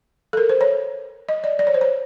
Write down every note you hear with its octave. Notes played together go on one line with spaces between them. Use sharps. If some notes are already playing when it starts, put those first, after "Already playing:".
A4
A#4
C5
C#5
D#5
D5
D5
C#5
C5
C#5